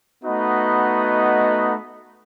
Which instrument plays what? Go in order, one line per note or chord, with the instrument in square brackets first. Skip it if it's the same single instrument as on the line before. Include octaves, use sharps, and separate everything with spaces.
[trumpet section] A3 B3 D#4 F#4 D#5 B5